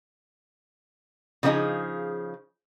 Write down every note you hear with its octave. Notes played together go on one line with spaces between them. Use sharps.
C#3 F3 A#3 C#4 D#4 G#4